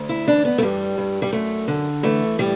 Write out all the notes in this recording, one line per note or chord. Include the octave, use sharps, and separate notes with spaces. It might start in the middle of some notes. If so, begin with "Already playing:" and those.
Already playing: D2
E4
E3 D4
B3
A3
G2 G3
G2
G3
F#2 A3
D3
E3 A3
A2 G3